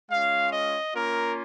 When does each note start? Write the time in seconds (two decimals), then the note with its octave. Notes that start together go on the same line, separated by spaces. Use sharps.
0.10 G#3 C#4 F4 F5
0.52 D#5
0.94 A#3 C#4 F4 A#4